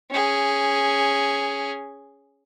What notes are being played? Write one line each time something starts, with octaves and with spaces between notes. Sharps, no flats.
C#4 G#4